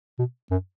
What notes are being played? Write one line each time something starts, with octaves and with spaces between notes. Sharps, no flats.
B2
F#2